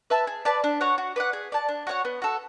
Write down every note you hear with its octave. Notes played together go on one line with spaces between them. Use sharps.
B4 E5 A5
G#4
B4 D5 A5
D4
F#4 C#5 F#5
F#4
B4 D5 F#5
G#4
D5 A5
D4
F#4 C#5 F#5
B3
F#4 A4